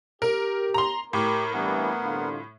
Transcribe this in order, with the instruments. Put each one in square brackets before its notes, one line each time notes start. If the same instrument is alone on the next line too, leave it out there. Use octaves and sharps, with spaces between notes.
[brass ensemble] G4 [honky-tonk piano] A#4
[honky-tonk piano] A#5 C6
[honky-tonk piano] A2 [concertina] G4 [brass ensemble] A#4
[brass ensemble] C2 G2 E3 [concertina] B3 A#4 F#5
[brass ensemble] C2 D3 F4